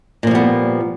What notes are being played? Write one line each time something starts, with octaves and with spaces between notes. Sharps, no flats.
A#2 F3 G3 B3